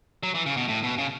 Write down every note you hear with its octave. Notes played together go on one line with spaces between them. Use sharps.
F#3
E3
C#3
B2
A2
B2
C#3